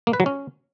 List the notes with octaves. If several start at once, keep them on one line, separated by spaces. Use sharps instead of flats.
A#3
B4
F#3
C#4